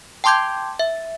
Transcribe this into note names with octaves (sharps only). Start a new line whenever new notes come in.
G5 A5 C6 D6 G6 G#6
E5